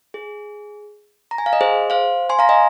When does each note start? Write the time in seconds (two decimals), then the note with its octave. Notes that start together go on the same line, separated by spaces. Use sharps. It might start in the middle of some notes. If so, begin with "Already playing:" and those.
0.14 G#4
1.31 A#5
1.38 G#5
1.46 F5
1.53 D#5
1.61 G#4 C5
1.90 C5 F5
2.30 G#5 C6
2.39 F5 A#5
2.49 D#5 G#5